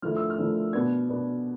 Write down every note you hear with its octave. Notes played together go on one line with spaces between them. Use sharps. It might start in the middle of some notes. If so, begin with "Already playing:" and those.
D3 F3 A3 E4 F6
E6
F6
D3 F3 A3 E4
B2 B3 D4 G#6
B2 B3 D4